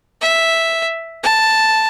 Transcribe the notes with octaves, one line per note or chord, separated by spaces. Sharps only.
E5
A5